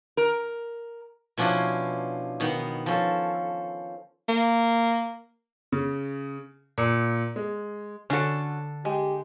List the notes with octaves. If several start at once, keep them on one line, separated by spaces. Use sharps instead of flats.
A#4
B2 F3 C#4 D4 E4
B2 D#3 B3
F3 C#4 A4
A#3
C#3
A#2
G#3
D3 C#4 F#4 A4
G#3 G4